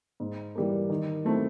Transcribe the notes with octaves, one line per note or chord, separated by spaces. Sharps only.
G#2
E3 G3 A#3
D#3
F#3 A3 C4 E4